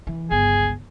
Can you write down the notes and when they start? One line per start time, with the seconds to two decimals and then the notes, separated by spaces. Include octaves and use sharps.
0.07 E3
0.31 G1 C#2 G#4